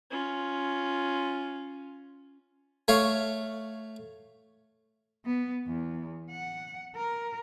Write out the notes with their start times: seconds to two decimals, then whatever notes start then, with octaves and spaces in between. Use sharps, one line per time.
0.10 C#4 F4
2.88 A3 C#5 F5
5.25 B3
5.67 E2
6.31 F#5
6.96 A#4